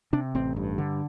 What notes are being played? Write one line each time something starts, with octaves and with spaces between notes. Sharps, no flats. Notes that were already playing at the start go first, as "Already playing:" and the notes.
C3 D4
A1 C4
G2
D3